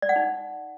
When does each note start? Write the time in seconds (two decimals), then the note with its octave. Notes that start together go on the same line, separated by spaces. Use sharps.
0.02 D5
0.09 F#5
0.16 D#4